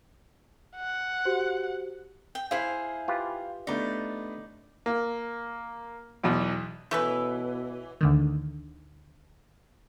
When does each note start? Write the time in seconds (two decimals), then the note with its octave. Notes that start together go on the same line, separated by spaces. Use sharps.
0.76 F#5
1.25 F#4 G4 C5
2.35 G5
2.51 E4 G#4 C5 F5
3.08 F4 G4 B4
3.67 A3 B3 D4 D#4 D5
4.86 A#3
6.24 B1 E2 B2
6.91 B2 E3 A3 C#4 B4
8.01 D2 D3 D#3